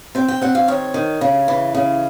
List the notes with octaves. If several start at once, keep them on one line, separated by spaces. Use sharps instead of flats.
C4 G5
G5
C4 F#5
F5
D#3 C#5
D#3
C#3
E3
C#3